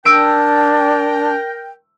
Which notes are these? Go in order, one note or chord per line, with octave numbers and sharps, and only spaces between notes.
D4 A#4 G5 E6 D7